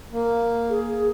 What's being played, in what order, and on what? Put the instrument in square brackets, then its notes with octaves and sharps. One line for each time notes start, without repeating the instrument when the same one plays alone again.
[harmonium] A#3
[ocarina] G#4